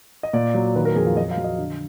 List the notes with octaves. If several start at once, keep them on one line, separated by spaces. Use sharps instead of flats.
D#5
A#2 D5
F#3
D#3 B4
A#4
F2 G#4
F4
F#3 D#5
F5
F#3
D#5
D3